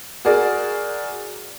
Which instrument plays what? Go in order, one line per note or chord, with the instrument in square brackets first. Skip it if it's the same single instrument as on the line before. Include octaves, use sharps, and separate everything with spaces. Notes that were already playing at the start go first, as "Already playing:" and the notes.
[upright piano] F#4 G#4 A#4 D5